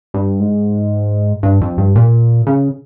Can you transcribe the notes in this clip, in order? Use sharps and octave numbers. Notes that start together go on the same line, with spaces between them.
G2
G#2
G2
F2
G2
A#2
C#3